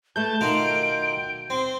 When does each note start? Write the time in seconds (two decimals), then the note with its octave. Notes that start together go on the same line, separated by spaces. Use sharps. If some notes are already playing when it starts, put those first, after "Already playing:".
0.16 A3 A4 B4 A5 G6
0.41 B2 D#3 F4 D7
1.50 C4 C6